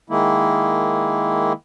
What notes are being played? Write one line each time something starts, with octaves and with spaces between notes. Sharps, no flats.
D#3 G#3 A#3 E4